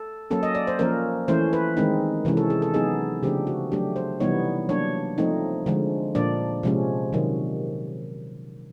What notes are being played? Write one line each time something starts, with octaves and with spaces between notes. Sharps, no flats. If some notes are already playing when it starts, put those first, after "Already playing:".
Already playing: A4
F#3 A#3 C#4 A4
D#5
D5
C5
F3 A#3 C#4 A#4
E3 A3 C#4 C5
B4
D#3 G#3 C4 D#4
C3 E3 G#3 C#4
A4
G#4
A4
F#3 B3 D#4 G#4
C#3 F3 A3 D4 G4
F#4
F#3 A3 D4 G4
C5
C3 E3 G3 B3 D#4 C#5
F#3 A#3 D4 C#5
F3 A3 C4 D#4
D3 F3 G#3
A#2 F3 A#3 D4 D5
C3 F3 G#3 C#4
C3 D#3 F#3